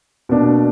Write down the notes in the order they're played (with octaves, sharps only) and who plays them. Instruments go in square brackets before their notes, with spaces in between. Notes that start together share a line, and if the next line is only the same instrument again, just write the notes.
[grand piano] B2 A#3 D4